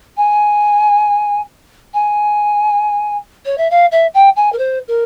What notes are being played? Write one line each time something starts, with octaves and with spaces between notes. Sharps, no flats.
G#5
G#5
C#5
E5
F5
E5
G5
G#5
A#4
C5
A#4